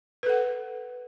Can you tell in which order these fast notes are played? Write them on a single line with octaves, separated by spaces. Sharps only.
B4 A4 F#5